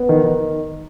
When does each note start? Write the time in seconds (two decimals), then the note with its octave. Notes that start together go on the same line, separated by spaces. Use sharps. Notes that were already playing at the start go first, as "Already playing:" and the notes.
Already playing: B3
0.09 D#3
0.23 D#3